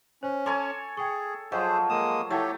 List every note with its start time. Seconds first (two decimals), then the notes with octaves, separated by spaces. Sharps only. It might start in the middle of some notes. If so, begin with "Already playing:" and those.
0.23 C#4 C5
0.46 A4 C#5 G#5 C6 D6
0.97 G#4 G5 C#6
1.52 F3 F#3 G#4 C5 D#5 F5
1.90 G#3 A#3 D#6 E7
2.30 A3 E4 G4 A4 C#5 F#5 D6